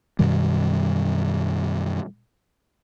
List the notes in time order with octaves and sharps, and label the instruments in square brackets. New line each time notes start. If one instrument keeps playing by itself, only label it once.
[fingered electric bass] F#2 B2 D#3 G3